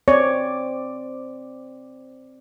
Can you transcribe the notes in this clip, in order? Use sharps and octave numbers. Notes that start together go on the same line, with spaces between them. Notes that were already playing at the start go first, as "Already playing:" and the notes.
C4 C#5 D5